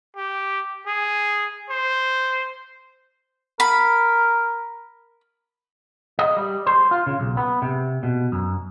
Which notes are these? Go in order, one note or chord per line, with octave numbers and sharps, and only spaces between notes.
G4
G#4
C5
A#4 B5
D#5
G3
C5
F4
C#3
B1
B3
C3
B2
F#2